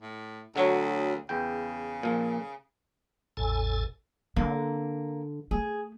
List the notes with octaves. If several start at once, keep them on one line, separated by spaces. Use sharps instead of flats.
A2
D2 D3 F#3 C#5
E2 C#3 G5
A#2 F3
A1 E2 A2 A4 G#5
D3 A#3 C4
A3 G#4